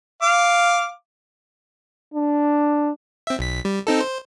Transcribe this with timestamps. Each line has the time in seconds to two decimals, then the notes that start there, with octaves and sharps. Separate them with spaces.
0.22 F5 D6
2.14 D4
3.27 C4 E5
3.39 B1 B6
3.65 G3
3.87 C4 D#4 A4
4.00 C5